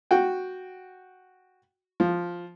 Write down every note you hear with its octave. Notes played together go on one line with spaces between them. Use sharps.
F#4 G5
F3